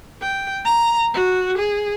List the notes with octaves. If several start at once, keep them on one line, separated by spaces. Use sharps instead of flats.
G5
A#5
F#4
G#4